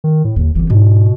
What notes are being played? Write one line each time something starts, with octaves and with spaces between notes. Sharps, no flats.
D#3
A2
D#2 D3 A#3
G1 E3 C4
G#2 B2